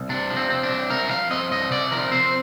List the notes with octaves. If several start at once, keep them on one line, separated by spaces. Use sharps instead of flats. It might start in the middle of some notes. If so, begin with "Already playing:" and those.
Already playing: C2
C3 D4
F3
C4
C4
D4
C2
C3 A#4
F3 F5
C4 D#5
C2 D#5
C3 D5
F3 A#4
C4 C5